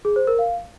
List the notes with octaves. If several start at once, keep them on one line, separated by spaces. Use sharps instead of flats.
G#4
C5
A#4
F5